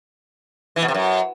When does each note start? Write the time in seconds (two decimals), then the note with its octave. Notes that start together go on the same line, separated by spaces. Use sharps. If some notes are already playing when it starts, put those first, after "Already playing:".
0.76 E3
0.82 B2
0.88 C3
0.94 F#2